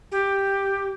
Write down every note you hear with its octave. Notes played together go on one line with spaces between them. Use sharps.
G4